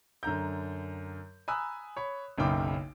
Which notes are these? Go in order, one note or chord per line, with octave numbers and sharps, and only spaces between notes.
F#2 D3 A#5 G6
G#5 A#5 B5 D#6 E6 F#6
C#5 B5
F#1 B1 C#3 G5 D6